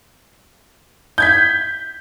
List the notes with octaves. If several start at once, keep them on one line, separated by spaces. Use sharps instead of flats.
G6 G#6 B6